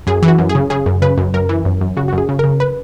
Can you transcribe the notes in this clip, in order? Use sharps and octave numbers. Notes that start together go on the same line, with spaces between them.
F#2 G#4
E3
F#4
F#2
G#4
C#3
C#3 G#4
F#2
C#3 B4
F#2
F#2 A#4
E3
F#2
F#2
C#3 F#4
F#2 F#4
G#4
C#3
C#3 A#4
B4